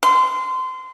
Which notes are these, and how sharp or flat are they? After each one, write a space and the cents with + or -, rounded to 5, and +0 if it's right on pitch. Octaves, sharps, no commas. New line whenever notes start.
C6 -25